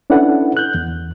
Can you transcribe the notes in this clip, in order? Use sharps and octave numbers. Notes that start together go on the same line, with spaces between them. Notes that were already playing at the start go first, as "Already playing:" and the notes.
C#4 D4 E4 A4 B4 F#5
F#6 G6
E2